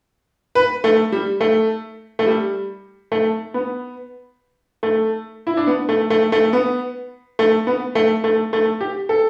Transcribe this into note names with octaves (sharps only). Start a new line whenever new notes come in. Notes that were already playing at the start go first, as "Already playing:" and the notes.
B4
A3
G3
A3
A3
G3
A3
B3
A3
E4
D4
B3
A3
A3
A3
B3
A3
B3
A3
A3
A3
G4
A4